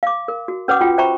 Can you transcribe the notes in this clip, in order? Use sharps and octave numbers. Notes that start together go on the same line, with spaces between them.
F5 D6
A#4
F#4
C#4 B4 C#5 F#5 D6 D#6
F4 F#4 G5
C5 E5 G5 A#5 B5 C#6